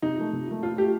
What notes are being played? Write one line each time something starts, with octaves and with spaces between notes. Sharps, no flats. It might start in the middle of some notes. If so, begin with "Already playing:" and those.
C3 D#4
F3 A3
C3
F3 A3
A2 F4
A3 G4